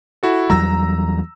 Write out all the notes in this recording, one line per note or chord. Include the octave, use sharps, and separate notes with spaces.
E4 F#4 A4
E2 F#3 G3 A#5 E6 A#6